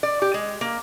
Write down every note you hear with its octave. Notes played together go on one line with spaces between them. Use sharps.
D5
G4
G#3
A#3